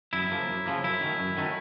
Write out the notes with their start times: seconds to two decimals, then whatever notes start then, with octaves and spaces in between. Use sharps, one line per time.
0.13 F#2 E4
0.30 C#3 F3 A#3
0.48 F#2
0.66 C#3 F3 A#3
0.84 F#2 E4
1.01 D#3 F#3 A3 C#4
1.19 F#2
1.37 D#3 F#3 A3 C#4